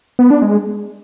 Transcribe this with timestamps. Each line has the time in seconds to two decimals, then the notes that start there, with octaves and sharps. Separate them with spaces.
0.19 B3
0.31 D4
0.42 G#3